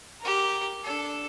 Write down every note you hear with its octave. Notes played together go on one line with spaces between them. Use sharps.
G4 A#4
D4 A4